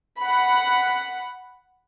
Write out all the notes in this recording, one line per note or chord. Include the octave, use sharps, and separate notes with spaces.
F#5 B5